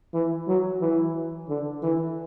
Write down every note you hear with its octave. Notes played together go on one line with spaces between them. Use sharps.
E3
F#3
E3
D3
E3